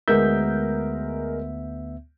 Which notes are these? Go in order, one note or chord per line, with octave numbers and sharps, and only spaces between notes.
D2 G#3 B3 A#4 E5 G6